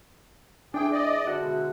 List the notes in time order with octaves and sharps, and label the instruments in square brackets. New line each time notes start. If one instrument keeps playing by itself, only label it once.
[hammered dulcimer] E3 G#3 [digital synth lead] D4 [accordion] G#4 G5
[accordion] D5 D#5
[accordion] D3 [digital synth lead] F#4 [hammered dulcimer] A4 D#5
[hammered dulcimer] B2 G#3 E4